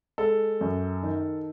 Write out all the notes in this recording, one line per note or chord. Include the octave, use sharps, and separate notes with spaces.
G#3 A4
F#2
D#3